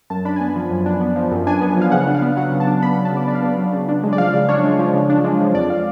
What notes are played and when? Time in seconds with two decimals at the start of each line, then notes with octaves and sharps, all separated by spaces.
0.10 F#2 A5
0.25 D4 B5
0.36 G#5
0.40 B3 A5
0.56 F3
0.71 F#2
0.86 D4
1.01 B3
1.16 F3
1.31 F#2
1.47 D4 G#5
1.61 B3
1.77 F3 F5
1.92 C#3 F#5
2.07 D4
2.15 F5
2.22 B3
2.37 F#3 F#5
2.52 C#3
2.60 A5
2.67 D4
2.82 B3 B5
2.94 F#3 B5
3.05 A5
3.13 C#3 D5
3.28 D4 D5
3.35 F5
3.42 B3 D5
3.58 F#3
3.73 C#3
3.88 D4
4.03 G#3
4.13 D5
4.18 F3 F5
4.34 C#3 D5
4.49 D4 C#5
4.64 G#3
4.79 F3
4.94 C#3
5.10 D4
5.24 G#3
5.40 F3
5.54 F2 D5
5.70 F5